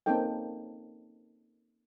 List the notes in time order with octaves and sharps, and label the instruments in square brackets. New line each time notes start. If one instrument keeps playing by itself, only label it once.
[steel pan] A#3 C4 C#4 D#4 A4 G5